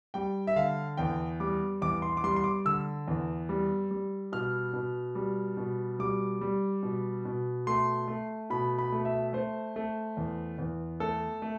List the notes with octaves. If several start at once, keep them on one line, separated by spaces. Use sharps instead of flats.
G3 G5
E5
D3 F5
E2 G5
G3 D6
E2 D6
C6
D6
G3 C6
C6
D6
D3 E6
E2
G3
G3
B2 F6
B2
G3
B2
G3 D6
G3
B2
B2
A3 C6
A3
B2 B5
B5
A3
E5
A3 C5
A3
E2
E2
A3 A4
A3